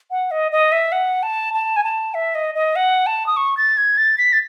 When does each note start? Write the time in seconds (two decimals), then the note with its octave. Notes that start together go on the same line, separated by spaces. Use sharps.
0.11 F#5
0.31 D#5
0.52 D#5
0.72 E5
0.92 F#5
1.23 A5
1.54 A5
1.76 G#5
1.84 A5
2.14 E5
2.35 D#5
2.55 D#5
2.76 F#5
3.06 A5
3.26 D#6
3.37 C#6
3.57 A6
3.77 G#6
3.97 A6
4.18 B6
4.33 A6